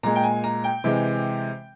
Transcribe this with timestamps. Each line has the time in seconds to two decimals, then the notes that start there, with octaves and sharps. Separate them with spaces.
0.03 A#2 G#3 A#5
0.15 G5
0.23 G#5
0.44 A#5
0.64 G5
0.84 C3 E3 G#3